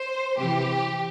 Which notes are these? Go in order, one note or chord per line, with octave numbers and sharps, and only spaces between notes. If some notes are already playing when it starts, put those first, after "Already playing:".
Already playing: C5
C3 E3 G4